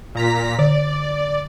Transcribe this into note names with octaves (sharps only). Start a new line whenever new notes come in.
A#2 A#5 B6
D3 D5